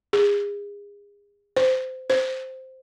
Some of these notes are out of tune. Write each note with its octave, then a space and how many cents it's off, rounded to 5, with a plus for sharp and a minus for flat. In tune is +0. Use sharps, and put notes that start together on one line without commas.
G#4 -35
C5 -20
C5 -5